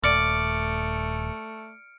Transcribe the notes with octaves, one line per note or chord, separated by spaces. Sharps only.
D#1 A3 D5 F6 C#7 D7